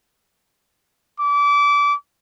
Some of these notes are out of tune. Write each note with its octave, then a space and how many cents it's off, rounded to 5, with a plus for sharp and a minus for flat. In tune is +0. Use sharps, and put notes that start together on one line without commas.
D6 -25